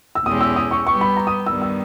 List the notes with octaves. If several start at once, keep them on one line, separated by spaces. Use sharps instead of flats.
E6
E2 B2 G#3 C#4 G4 D#6
E6
D#6
C#6
G3 B3 G4 C#6
B5
A#5
D#6
G2 D#3 G3 B3 E6
E6